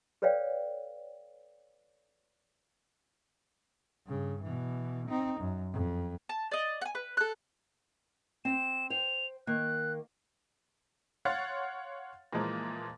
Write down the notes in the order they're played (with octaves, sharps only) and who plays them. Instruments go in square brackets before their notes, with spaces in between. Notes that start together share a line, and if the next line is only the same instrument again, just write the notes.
[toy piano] A4 B4 C#5 D5 F5 G5
[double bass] G2 C#3
B2 E3
C4 D#4
F#2
F2
[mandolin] A5
D5 D#5
F#5 G#5
B4
A4 F#6
[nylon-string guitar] C4 [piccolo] E7
[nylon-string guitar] C5 G5 [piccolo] F7
[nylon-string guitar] D#3 A#3 [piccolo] F#6
[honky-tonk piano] C#5 F5 F#5 C6 F6 A6
A#2 E3 F3 G#3 A#3